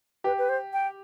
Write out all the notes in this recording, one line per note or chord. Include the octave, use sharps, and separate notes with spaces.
G4 B4
B4
C5
G5